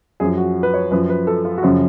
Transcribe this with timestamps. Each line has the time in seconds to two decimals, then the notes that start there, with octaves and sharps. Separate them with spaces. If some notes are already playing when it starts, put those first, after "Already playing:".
0.20 F#2 F3 G#4
0.37 F#4
0.63 B4
0.74 C#5
0.91 F#2 F3 B4
1.10 B4
1.27 A4
1.45 F4
1.58 F#4
1.63 F#2 C#3 F3 F4